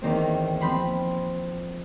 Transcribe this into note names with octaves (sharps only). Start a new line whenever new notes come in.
E2 D#3 A#3 C4
F3 C4 B5 C6